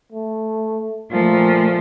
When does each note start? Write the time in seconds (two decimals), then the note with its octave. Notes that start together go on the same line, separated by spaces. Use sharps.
0.12 A3
1.12 A#2 F3 A3